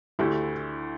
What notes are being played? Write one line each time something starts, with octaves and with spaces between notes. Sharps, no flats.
D2 D3 A3 E4 G4